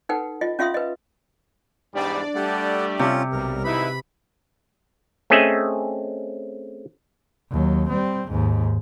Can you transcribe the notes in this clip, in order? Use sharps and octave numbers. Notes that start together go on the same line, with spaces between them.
D#4 A4 B4 F#5 G5
F4 D#5
C#4 F4 E5 F5 C6 D#6
B4 D#5
E2 G#2 G3 D4 D5
G3 A3 G4 A4 F#5
C3 C#4 F4
B1 G3 A#4
G#1 D#4 E4 B4 B5
A3 C4 C#4 G#4 D#5 E5
D#2 F#3
G3 C4
D#2 G#2